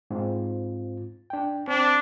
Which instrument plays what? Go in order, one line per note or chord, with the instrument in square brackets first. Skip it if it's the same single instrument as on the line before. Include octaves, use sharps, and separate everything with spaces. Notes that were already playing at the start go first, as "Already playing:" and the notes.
[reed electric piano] G#2 C4 F4
D4 G5
[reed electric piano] C4 [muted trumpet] D4